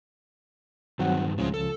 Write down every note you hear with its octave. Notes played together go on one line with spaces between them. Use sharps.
G2 D#3 F#3 C4 F#5
C#2 A2 C#3 F3 G#3 C5
A4